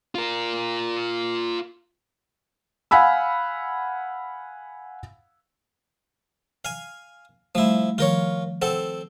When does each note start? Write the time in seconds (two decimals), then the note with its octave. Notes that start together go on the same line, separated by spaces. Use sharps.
0.15 F4 A#4
2.91 F5 F#5 G#5 B5 E6
6.65 F5 G#5
7.55 F3 G3 A3 E4
7.98 D#3 F3 F4 A#4 C#5
8.62 C4 A4 F#5